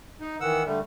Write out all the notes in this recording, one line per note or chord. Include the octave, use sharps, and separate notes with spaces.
D#4
D#3 E3 F#5 E6
D3 G3 A3